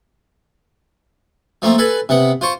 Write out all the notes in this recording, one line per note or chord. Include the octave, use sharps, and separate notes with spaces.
F3 A3 A#3 C4
A4 B4 G#5 B5
C3 B3 F#5
F4 C5 C#6